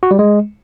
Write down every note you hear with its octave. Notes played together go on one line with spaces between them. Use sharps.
F#4
G3
G#3